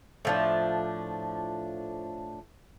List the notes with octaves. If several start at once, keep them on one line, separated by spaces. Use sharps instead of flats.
A2 F3 D4